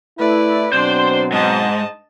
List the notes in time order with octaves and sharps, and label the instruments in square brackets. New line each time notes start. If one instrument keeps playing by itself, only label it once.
[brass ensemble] A3 E4 [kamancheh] B4 D5
[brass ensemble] B2 F#3 C4 [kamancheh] D4 D5 [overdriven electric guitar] C5 C6
[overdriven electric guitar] G#2 [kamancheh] D#5 A5